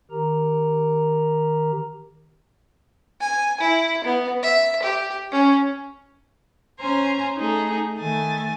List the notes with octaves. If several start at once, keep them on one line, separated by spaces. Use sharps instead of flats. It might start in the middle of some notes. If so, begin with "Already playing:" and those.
D#3 G4 A#4 A#5
G#5
E4
B3
E5
G4
C#4
C#4 C5 G#5 A#5 C6
A3 D#4 G#4 A4
D#3 A3 G#5 A6